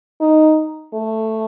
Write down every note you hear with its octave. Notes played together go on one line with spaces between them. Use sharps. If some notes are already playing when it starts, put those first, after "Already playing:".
D#4
A3